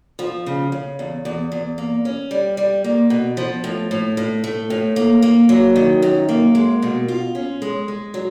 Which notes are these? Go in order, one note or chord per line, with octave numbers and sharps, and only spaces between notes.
F3
C#3
C#3
E2
E2
E2
A#3
C#4
G3
G3
A#3
B2
F3
A2
A2
A2
A3
A2
A#3
A#3
F#3
D#3
F#2
A#3
G#3
B2
F4
C#4
G#3
G#3
F#3